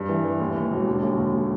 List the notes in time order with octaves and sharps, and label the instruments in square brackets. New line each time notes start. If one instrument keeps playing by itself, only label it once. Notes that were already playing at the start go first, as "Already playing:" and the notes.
Already playing: [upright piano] G2
E3
E3
D#2
D#2
E1
D3
D#2
D#2